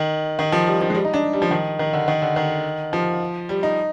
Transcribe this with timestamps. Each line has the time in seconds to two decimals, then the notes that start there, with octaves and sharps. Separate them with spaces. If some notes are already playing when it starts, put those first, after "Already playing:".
Already playing: D#3
0.39 D#3
0.52 F3
0.67 G3
0.81 F3
0.90 G#3
0.95 G3
1.05 D#4
1.14 D4
1.33 G3
1.42 F3
1.51 D#3
1.79 D#3
1.93 D3
2.08 D#3
2.22 D3
2.36 D#3
2.93 F3
3.49 G3
3.63 D#4